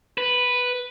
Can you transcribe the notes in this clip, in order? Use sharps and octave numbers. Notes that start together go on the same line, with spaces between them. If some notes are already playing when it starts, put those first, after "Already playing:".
B4